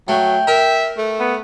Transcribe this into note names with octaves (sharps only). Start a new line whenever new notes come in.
F#3 A3 G5
A#4 E5
A3
B3